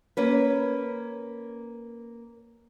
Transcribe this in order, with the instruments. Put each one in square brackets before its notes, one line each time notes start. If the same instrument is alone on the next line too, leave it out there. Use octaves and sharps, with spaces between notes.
[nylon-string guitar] A#3 C#4 B4